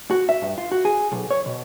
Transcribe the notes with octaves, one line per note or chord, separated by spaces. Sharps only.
F#4
E5
G2
F4
F#4
G#4
B1
C#5
B2